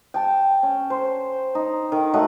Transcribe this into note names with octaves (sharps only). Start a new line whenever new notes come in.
G5 A5
C#4
C5
D#4
D#3
F#3 A3 D#5 F#5